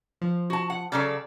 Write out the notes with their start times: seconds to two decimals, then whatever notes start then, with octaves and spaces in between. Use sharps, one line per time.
0.21 F3
0.50 F#4 A5
0.70 F#5
0.92 C#3 F#3 A4 D5